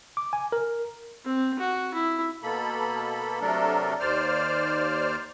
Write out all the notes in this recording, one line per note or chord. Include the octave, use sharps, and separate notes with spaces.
D6
G#5
A#4
C4
F#4
E4
B2 A#3 A4 B5
C3 F#3 A3 D4 A4 A#4
D#2 C5 D5 F6